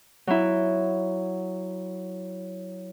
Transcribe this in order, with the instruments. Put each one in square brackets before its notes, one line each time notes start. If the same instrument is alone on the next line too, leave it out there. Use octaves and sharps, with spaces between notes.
[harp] F#3 E4